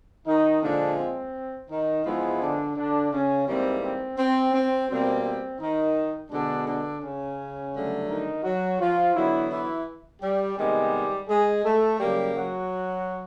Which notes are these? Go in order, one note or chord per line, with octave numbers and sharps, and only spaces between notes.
D#3 D#4
A#2 D3 F3 G#3 D4
C4
D#3 D#4
G#2 E3 F3 G#3 B3 E4
D3 D4
D3 D4
C#3 C#4
G#2 E3 G3 A#3 C4
C4
C4
C4
B2 G3 A#3 C4
C4
D#3 D#4
B2 D3 G#3 B3 D4
D3 D4
C#3 C#4
G2 D3 F#3 A3
D#3 D#4
F#3 F#4
F3 F4
D3 E3 F#3 B3 E4
E3 E4
G3 G4
C3 D#3 G3 G#3 B3 G4
G#3 G#4
A3 A4
C#3 F#3 G3 A#3 G4
F#3 F#4